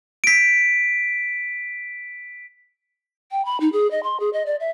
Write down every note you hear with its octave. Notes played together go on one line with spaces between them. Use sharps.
B6 D7
G5
B5
D#4
G#4
D#5
C6
G#4
D#5
D5
E5